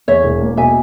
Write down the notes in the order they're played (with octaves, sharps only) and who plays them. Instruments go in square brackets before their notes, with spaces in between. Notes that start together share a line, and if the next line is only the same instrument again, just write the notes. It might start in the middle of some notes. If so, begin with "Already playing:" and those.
[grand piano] E2 [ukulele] C#5 E5
[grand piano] E1
A#3
[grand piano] B2 [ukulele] E5 G#5